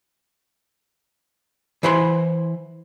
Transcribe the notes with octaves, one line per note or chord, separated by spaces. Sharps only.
E3 E4 C5 F#5 B5 C6